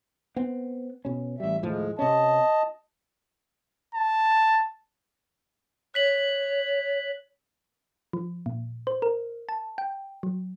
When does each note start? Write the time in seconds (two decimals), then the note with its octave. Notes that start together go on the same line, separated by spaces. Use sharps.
0.36 B3 C4
1.05 B2 C#4
1.40 A1 G3 E5
1.63 D#2 A2 F3 G#3
1.99 C3 C#4 D#5 A5
3.94 A5
5.94 C#5 F#6 B6 F#7
8.13 F3
8.46 A#2
8.87 C5
9.02 A#4
9.49 A5
9.78 G5
10.23 F#3